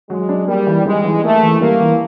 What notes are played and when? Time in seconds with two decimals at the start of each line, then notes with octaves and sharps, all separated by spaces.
0.10 F#3 G#3
0.29 D4
0.47 G3 A#3
0.67 E3
0.86 G3 G#3
1.04 E3
1.23 A3 A#3
1.43 E3
1.61 G3 A#3
1.80 E3